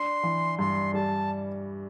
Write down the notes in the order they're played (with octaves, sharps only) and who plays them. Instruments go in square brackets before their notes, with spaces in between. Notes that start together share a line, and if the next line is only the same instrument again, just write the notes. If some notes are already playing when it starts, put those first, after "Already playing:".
Already playing: [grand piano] D4 [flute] C6
[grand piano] E3
[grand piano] G2 [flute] C6
[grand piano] G3 [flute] A5